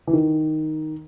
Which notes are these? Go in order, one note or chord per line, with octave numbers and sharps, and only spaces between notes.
E3
D#3